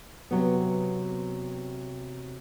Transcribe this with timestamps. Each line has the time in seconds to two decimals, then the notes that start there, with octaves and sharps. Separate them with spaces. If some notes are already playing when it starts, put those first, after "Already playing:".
0.31 C3 F#3 B3